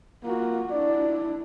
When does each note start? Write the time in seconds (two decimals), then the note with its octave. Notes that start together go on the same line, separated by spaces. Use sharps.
0.24 A#3 F4 F#4
0.70 D4 E4 D5